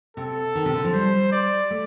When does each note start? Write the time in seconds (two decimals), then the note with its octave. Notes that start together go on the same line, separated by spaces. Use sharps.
0.17 C3 A4
0.55 D#3
0.65 C3
0.74 D3
0.85 F3
0.93 G3 C5
1.32 D5
1.71 A3